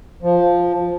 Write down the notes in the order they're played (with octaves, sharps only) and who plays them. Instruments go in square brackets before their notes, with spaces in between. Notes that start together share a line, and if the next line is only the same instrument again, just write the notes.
[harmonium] F3